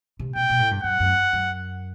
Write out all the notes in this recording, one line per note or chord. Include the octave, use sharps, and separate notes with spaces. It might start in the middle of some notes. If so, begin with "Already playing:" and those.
C3
B2 G5
B2
A2
G2
F#2 F#5
F#2
F#2